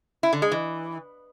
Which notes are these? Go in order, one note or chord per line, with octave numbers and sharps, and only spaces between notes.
E4
D3
G#3
E3